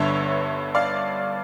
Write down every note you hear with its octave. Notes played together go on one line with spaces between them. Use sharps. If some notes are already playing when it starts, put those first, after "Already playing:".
Already playing: G1 G2 D3 C#5 E5
D5 F5